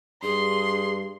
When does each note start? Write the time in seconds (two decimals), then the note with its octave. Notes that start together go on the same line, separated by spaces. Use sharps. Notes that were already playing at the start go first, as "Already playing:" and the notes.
0.23 G2 G#4 C6